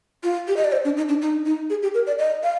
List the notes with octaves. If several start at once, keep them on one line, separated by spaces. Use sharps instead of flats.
F4
G4
D#5
D5
C5
D4
D#4
D4
D#4
D#4
G#4
G4
A#4
D5
D#5
F5